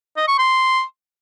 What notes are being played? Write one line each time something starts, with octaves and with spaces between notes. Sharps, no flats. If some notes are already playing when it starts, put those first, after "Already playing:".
D#5
C#6
C6